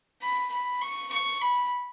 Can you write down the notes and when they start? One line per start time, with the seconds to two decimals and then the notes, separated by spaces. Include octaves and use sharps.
0.21 B5
0.52 B5
0.81 C#6
1.12 C#6
1.42 B5